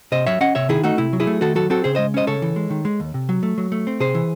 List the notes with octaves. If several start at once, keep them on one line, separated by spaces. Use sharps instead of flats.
C3 C5 D#5
F#3 C#5 E5
C#4 D#5 F#5
C3 C#5 E5
D#3 E4 G#4
A3 D#4 F#4
C3 E4
F#3
E4 G#4
A3
D#3 F#4 A4
F#3 F#4 A4
C4 F#4 A4
C#3 G#4 C5
G#3 C5 D#5
C#4 C5 D#5
C#3 A4 C#5
E3
G#3
D#3
G#3
D#2
C3
F#3
A3
F#3
A3
C4
C3 G#4 C5
E3